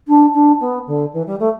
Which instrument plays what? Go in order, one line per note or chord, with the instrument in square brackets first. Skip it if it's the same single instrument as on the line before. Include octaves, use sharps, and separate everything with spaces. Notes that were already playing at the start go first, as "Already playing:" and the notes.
[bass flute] D4
D4
B3
D3
E3
G3
A3